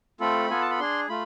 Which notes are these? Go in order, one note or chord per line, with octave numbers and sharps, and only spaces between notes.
A3 C4 F4 A4 B5
B3 F4 A4 G#5
A5
B5
D4 G#4 C6
A3 F4 B5